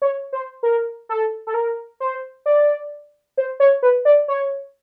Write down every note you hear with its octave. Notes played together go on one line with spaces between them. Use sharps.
C#5
C5
A#4
A4
A4
A#4
C5
D5
C5
C#5
B4
D5
C#5